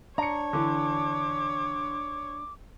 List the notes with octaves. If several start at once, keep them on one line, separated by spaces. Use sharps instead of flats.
D4 C#5 A#5 C#7
D3 E3 D6